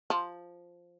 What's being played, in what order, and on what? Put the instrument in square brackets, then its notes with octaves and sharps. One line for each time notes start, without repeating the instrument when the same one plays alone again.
[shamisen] F3